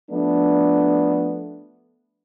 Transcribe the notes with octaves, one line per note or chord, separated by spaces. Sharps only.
F3 A3 B3 D4